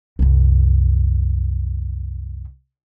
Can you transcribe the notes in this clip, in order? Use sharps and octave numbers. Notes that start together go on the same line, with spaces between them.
C2 F#2